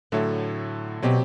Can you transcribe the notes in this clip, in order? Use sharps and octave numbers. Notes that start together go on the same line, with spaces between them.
A2 D3 F#3 A3
B2 F#3 C4 G4